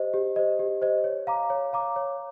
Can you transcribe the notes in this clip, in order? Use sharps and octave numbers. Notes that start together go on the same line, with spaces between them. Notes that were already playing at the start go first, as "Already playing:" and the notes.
Already playing: G4 C5 D#5
G4
C5 D#5
G4
C5 D#5
C#5
F5 A#5 D6
C#5
F5 A#5 D6
C#5